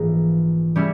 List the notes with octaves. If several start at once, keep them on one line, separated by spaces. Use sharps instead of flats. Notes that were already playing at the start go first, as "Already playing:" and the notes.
Already playing: A#1 G#2 E3 A#3 A#5
G3 C#4 E4